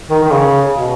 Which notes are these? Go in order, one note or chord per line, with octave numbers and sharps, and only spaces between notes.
D#3
D#3
C#3
B2